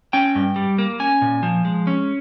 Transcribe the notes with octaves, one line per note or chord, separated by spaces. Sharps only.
C#4 G5
G2
G3
A#3
C#4 G#5
A#2
F3
G#3
C#4